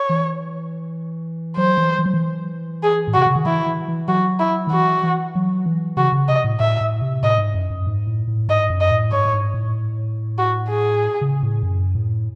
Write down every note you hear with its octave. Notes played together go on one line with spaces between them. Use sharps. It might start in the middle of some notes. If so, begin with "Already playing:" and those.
Already playing: C#5
E3
F#3 C5
E3
E3
F#3
E3
G#4
A2
C3 F#4
C#3
D#3
E3 E4
E3
E3
F#3 F#4
E4
D#3
E3 F#4
E3
F#3
E3
C#3 F#4
C#3
C3 D#5
A2
A2 E5
A2
C3
A2 D#5
G#2
F#2
F#2
G#2
A2
A2
G#2 D#5
F#2
D#5
A2
G#2 C#5
A2
G#2
A2
F#4
G#4
C#3
A2
F#2
A2